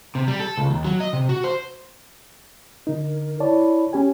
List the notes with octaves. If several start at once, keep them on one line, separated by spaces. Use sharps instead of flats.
C3
G3
A4
C#2
D#2
F#3
D#5
C3
F#4
C5
D3 D#4 A#4
E4 C#5 D5 A5
C#4 G4 G#5